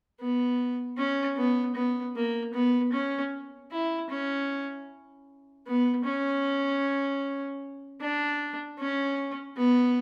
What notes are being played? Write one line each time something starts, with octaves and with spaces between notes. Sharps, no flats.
B3
C#4
B3
B3
A#3
B3
C#4
E4
C#4
B3
C#4
D4
C#4
B3